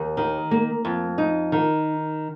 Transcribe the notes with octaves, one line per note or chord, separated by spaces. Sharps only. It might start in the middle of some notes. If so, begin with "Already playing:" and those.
Already playing: D#2
D#3
A#3
F2
D#4
D#3